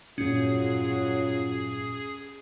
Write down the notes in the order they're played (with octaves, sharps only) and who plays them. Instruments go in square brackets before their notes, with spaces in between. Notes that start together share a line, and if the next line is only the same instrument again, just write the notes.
[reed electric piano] E2 G2 A#2 [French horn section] F#3 F4 [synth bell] C#4 [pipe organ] G#4